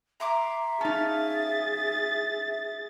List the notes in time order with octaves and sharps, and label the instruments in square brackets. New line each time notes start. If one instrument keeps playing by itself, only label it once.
[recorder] E5 [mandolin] A#5 C6 D6
[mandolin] C#4 F5 [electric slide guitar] D#4 A5 [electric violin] G#4 A6